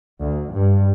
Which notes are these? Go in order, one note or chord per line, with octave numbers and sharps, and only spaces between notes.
D2
G2